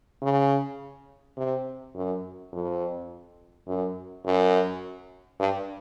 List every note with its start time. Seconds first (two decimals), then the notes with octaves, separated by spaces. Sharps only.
0.22 C#3
1.37 C3
1.95 F#2
2.52 F2
3.67 F#2
4.25 F#2
5.39 G2